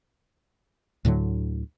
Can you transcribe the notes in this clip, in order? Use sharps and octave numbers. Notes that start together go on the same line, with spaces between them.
D2 A2 D3 F#3